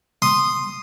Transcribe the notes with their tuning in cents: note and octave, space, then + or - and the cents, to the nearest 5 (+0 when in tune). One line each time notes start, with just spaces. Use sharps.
C6 +0 D#6 -10